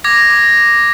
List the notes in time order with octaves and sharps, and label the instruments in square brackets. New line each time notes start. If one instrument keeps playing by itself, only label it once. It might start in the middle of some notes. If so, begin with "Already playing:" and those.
[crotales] D6 G#6 A#6